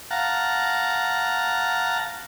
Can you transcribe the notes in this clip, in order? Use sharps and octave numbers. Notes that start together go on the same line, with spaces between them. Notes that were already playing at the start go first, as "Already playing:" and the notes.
F5 F#5 A5 A#5